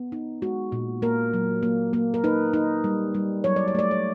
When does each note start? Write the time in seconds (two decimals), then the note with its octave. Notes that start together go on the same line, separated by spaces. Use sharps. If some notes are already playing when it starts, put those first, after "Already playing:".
Already playing: B3
0.12 D#4
0.42 G#3 F#4
0.72 A#2
1.02 A#3 A#4
1.34 F#3
1.63 A#3
1.93 A#3
2.14 A#4
2.24 D#4 B4
2.53 D#4
2.84 G3
3.15 G3
3.44 F#3 C#5
3.56 D5
3.68 C#5
3.75 A3 D5
3.91 C#5